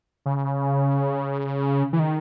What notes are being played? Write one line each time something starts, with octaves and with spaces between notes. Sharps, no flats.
C#3
E3
D#3